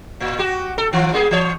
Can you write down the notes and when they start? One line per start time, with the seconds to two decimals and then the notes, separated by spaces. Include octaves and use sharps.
0.20 A2
0.39 F#4 G4
0.78 A4
0.93 D#3 F3 F4
1.13 G3 A#3 G#4
1.31 E3 C#5